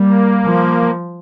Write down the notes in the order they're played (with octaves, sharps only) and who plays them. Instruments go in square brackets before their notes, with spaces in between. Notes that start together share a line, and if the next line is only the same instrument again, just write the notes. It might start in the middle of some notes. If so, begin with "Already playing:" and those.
Already playing: [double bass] G3 [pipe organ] A#3
[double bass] F3